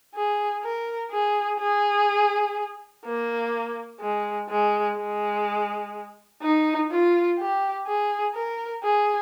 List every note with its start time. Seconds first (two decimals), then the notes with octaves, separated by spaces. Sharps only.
0.15 G#4
0.63 A#4
1.11 G#4
1.60 G#4
3.05 A#3
4.01 G#3
4.50 G#3
4.97 G#3
6.42 D#4
6.91 F4
7.39 G4
7.87 G#4
8.35 A#4
8.83 G#4